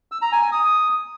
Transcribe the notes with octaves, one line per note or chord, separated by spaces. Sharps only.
E6
A#5
G#5
G#5
D#6